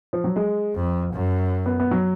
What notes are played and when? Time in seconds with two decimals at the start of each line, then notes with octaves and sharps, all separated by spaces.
0.13 F3
0.24 F#3
0.36 G#3
0.76 F2
1.14 F#2
1.66 B3
1.80 B3
1.91 F#3